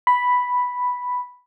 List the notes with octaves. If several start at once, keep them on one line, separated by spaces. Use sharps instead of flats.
B5